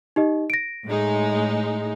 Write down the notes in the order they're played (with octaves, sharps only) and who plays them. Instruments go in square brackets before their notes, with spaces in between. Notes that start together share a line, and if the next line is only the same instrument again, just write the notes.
[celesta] D#4 G4 D#5
A#6 D7
[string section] A2 G#3 D#4